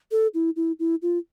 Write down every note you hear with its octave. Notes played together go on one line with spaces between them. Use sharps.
A4
E4
E4
E4
F4